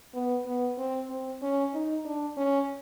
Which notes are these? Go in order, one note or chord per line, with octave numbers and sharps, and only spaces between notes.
B3
B3
C4
C4
C#4
D#4
D4
C#4